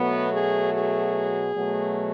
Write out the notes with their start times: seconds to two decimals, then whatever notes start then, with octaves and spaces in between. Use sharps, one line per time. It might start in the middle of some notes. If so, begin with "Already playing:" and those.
Already playing: B2 F#3 A3 B3
0.31 G#4
0.73 G#4
1.56 B2 F#3 A3